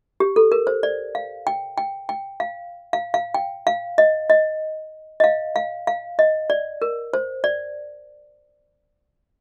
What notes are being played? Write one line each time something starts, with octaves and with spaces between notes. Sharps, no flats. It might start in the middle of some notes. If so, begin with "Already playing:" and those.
G4
A4
A#4
C5
D5
F5
G5
G5
G5
F5
F5
F5
G5
F5
D#5
D#5
D#5
F5
F5
F5
D#5
D5
A#4
C5
D5